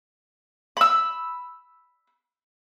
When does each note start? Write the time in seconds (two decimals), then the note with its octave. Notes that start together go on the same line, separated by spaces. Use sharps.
0.77 B5 E6